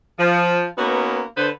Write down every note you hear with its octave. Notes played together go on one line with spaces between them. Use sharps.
F3
A#3 B3 C#4 D#4 F#4 B4
D3 B4 C5